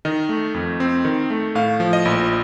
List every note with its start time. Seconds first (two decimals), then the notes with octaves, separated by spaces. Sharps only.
0.05 D#3 D#5
0.29 A3
0.54 F2
0.80 C4
1.05 D#3
1.30 A3
1.55 A2 F5
1.80 F3
1.93 D#5
2.05 A#1